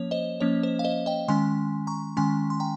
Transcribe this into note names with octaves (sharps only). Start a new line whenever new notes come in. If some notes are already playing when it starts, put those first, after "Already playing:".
Already playing: F3 A#3 C#4 C#5
C5 D#5
F3 A#3 C#4 C#5
C5
F5
C5 D#5
D#5 G5
D#3 G#3 C#4 G#5 C6
A#5 C#6
D#3 G#3 C#4 G#5 C6
C6
G5 A#5